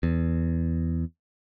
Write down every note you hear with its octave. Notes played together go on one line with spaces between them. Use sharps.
E2